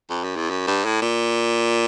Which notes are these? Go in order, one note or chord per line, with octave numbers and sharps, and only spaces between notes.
F2
F#2
E2
F#2
G2
A2
A#2